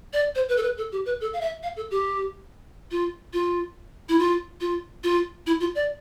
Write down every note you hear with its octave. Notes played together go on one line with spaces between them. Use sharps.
D5
C5
B4
A4
B4
A4
G4
B4
A4
F5
E5
F5
A4
G4
F4
F4
E4
F4
F4
F4
E4
F4
D5